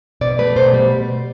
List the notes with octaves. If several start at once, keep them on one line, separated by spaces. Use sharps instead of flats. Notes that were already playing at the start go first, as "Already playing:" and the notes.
B2 D5
A3 B4
B2 C5
G3